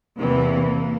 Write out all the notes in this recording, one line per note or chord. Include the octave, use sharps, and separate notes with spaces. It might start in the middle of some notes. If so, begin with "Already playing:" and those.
E2 C3 E3 A#3